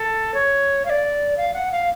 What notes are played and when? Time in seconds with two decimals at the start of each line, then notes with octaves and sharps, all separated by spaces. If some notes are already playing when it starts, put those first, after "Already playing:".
Already playing: A4
0.34 C#5
0.85 F5
0.89 D5
1.37 F5
1.54 F#5
1.71 F5